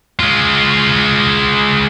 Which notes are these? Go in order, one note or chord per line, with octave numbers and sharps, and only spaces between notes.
G#3 F4